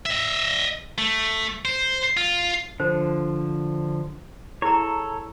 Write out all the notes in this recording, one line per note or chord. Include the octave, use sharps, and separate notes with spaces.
D#5 E5
A3
C5
F4
D3 F3 C5
E4 G#4 A4 C#5 A#5